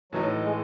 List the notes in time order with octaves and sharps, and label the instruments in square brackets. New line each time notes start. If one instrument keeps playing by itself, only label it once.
[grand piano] A2 E3 A3 D#4 [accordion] F#3
[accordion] G#3